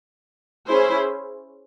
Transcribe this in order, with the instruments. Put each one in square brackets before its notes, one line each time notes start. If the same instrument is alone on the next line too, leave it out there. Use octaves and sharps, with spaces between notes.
[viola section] C#4 E4 G#4 C5